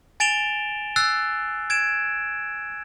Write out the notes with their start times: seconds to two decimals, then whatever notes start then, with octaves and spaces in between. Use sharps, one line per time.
0.20 G#5 A6 D7 E7 F7 G7
0.96 E6 F#6 A6 C7
1.70 G#6 D7 E7